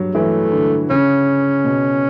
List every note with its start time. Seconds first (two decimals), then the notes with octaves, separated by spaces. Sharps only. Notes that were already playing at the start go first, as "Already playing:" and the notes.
Already playing: G2 F#3
0.14 E3 A3
0.52 D3
0.90 C#3 C#4
1.64 B2